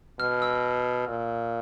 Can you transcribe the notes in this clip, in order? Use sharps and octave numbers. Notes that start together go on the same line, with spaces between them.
B2 F6
E6
A#2